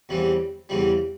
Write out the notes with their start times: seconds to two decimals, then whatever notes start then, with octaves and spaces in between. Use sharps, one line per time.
0.09 E2 C#3 E3 G3 C4
0.69 E2 C#3 E3 G3 C4